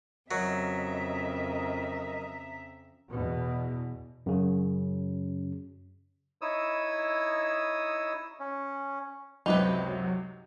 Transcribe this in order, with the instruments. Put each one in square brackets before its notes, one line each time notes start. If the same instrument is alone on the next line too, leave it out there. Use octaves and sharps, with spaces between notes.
[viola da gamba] F2 C#3 [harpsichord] F#3 [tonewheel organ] A#4 D#5 [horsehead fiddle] E5 A#5
[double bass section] E2 B2
[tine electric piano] F#2 C#3
[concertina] D#4 E4 C#5 D#6 E6
C#4
[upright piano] C#2 F#2 C3 [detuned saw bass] F#3 [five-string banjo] D#4 G4 B4